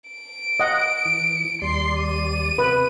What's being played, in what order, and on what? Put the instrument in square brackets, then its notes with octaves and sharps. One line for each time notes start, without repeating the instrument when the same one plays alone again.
[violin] D7
[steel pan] D#5 F#5
[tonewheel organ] E3
[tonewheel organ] D#2 G3 D5 [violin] C6
[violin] D#7
[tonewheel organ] C3 [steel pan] B4